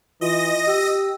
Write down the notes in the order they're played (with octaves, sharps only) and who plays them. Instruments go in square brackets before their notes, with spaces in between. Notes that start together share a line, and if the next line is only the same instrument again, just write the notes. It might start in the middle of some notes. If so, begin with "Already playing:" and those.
[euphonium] E3 [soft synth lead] F4 [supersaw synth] D#5 A#6
[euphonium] G4 [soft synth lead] E6